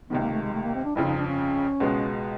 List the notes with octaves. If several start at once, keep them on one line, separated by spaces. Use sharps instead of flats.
C#2 C3 D#3 B3
A#3
A3
G#3
A3
A#3
C4
D4
G1 F2 C#3 F3 E4
D#4
D4
C#4
C#2 B2 G#3 B3